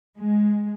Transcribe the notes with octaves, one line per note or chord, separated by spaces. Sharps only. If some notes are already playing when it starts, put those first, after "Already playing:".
G#3